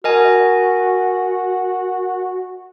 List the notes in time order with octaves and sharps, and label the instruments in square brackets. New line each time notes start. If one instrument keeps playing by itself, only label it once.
[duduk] F#4 [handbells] A#4 D#5 G#5